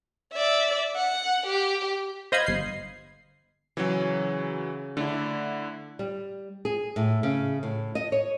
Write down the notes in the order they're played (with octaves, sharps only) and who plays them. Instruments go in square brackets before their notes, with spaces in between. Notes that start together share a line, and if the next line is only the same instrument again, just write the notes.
[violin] D5 E5
F#5
G4
[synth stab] C5 D#5 F5 B5 G#6
G1 C7
[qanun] C#3 G#4 C#5 [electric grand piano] E3 F#3
[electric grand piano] D3 E4 [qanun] A3 D4
[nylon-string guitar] G3
G#4
A2
C#3
A2
D#5
C#5